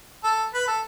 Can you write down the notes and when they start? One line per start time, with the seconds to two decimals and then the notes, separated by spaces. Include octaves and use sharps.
0.24 A4
0.54 B4
0.67 A4